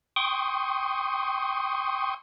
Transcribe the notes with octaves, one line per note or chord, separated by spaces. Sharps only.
G5 C6 C#6 D#6